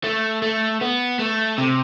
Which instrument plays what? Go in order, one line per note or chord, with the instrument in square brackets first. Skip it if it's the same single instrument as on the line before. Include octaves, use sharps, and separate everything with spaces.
[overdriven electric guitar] A3
A3
B3
A3
C3